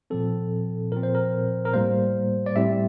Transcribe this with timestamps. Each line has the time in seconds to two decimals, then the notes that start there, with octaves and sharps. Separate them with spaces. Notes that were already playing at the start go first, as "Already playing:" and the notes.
0.10 A#2 F3 C4 A4
0.92 A#2 F3 C4 A#4
1.03 C5
1.15 A#4
1.65 A#4
1.74 A2 G3 A#3 C5
2.46 D5
2.56 A2 G3 C4 E5